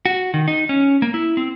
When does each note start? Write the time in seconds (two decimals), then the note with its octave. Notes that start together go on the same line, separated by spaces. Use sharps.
0.06 F#4
0.34 D#3
0.48 D#4
0.69 C#4
1.02 A#3
1.14 E4
1.37 C4